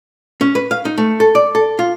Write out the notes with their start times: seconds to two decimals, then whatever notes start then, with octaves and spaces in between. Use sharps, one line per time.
0.41 C#4
0.55 B4
0.71 F5
0.85 D#4
0.98 A3
1.20 A4
1.35 D5
1.55 A4
1.79 F4